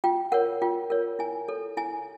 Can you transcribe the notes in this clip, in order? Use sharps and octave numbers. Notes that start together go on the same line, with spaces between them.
F4 G5
A#4 C#5 F#5
F4 G5
A#4 C#5
E4 G#5
A4 C#5
E4 G#5